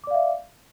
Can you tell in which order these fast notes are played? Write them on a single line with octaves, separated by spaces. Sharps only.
D6 D5 F5 E5